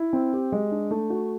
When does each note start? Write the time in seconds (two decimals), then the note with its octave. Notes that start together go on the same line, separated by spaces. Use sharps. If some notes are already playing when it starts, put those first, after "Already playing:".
Already playing: E4
0.13 C4
0.33 G4
0.52 G#3
0.71 D4
0.91 A3
1.10 F#4